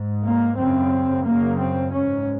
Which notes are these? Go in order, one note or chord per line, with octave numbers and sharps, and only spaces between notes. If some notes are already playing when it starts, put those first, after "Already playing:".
Already playing: G#2
A#3
F#2 C#3 C4
F#2 C#3 A#3
C4
G#2 C#4